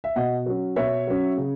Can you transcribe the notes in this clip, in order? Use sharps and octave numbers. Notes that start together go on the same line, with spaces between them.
E5
B2 D#5 F#5
F#3 C#4
B2 C#5 E5
F#3 C#4
C#3